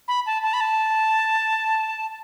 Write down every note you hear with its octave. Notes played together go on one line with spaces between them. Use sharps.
B5
A5
A5
B5
A5